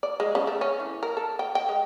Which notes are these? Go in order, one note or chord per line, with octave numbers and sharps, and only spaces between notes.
D5
G#3
C#3
A3
C#4
E3
A#4
A4
G5
G5
G#3